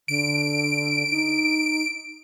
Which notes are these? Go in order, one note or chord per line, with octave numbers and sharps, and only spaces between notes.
D3 D7
D#4